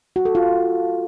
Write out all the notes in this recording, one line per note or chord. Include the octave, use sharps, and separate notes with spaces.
F#4
A4
F4